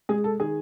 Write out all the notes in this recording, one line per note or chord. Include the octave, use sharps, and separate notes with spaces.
G#3 G#4
A4
D#3 G#4